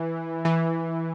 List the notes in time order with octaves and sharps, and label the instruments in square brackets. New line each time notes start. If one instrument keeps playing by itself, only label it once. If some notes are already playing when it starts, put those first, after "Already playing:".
Already playing: [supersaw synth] E3
E3